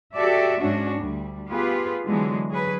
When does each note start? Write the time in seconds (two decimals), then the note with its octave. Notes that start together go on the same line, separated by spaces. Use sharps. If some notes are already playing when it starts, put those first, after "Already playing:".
0.14 F#4 G4 A4 D5 E5
0.58 G#2 C#4 D4 F#4
0.97 D2 G3
1.50 B3 F4 G4 G#4 B4
2.07 D3 E3 F#3 G#3 B3
2.49 F#3 G#4 B4